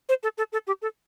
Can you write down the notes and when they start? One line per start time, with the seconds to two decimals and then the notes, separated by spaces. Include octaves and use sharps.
0.09 C5
0.23 A4
0.38 A4
0.52 A4
0.67 G4
0.82 A4